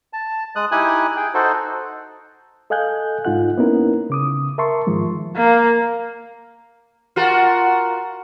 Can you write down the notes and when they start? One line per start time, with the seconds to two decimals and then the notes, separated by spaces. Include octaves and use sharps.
0.13 A5
0.56 G#3 D#6 F#6
0.72 D#4 E4 G4 G#5 D#6 F#6
1.17 G#4 G5
1.34 D#4 F#4 A4 C5
2.70 A4 D#5 F5 G#5 F#6 G6
3.25 G#2 D#4 F4 F#5 F#6
3.57 A#3 B3 C#4 D#4 E4 A#4
4.10 C#3 D6 D#6
4.58 A#4 E5 A5 C6 C#6
4.87 G#2 D#3 F3 G#3
5.36 A#3
7.16 F4 F#4 A#4